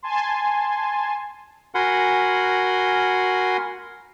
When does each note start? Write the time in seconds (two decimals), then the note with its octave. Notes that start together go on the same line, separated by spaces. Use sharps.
0.03 G#5 A5 C6
1.75 F#4 A#4 F#5 G#5 B5 C6